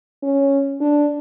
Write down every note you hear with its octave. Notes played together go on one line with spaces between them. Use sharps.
C#4
D4